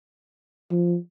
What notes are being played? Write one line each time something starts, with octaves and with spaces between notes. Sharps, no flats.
F3